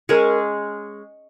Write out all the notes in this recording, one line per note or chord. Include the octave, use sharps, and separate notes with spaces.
G#3 C#4 G#4 A#4